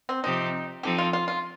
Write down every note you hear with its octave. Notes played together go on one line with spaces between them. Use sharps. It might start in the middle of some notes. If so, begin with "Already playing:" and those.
C4
C3 F3 C4 D#4 G4 C5
F3 C4 D#4 G4 A4
F4
F4
F4